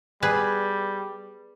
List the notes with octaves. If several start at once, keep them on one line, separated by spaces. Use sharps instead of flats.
G3 B3 G#4 B4